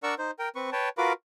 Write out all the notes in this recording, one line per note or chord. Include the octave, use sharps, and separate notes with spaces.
D4 A#4 D5 F#5 C#6 E6
D#4 C5
A#4 G5
C4 B4 C#6
B4 C#5 G5 A5
F4 F#4 A#4 B4 B5 D6